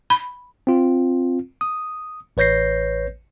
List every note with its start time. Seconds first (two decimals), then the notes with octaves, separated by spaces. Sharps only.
0.10 B5
0.67 C4 F4
1.61 D#6
2.37 A1 B4 C#5 G6 A#6 C7